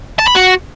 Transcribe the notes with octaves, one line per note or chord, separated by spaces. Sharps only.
A5
B5
F#4